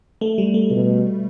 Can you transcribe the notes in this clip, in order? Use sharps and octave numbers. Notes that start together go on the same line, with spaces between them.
A3
G3
A3
B2